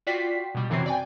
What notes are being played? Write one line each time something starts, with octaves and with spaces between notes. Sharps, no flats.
F4 F#4 D5 G5 B6 C7
B2 G3
F#2 C3 E3 C4 F#4 C7
D5 G5 G#5